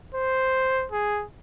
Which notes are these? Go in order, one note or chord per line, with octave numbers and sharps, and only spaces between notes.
C5
G#4